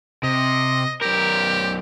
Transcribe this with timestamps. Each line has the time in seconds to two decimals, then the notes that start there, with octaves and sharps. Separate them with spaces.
0.23 C3 D#5
1.02 B1 G4 A#4